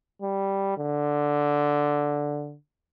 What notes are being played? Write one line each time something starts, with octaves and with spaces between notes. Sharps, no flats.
G3
D3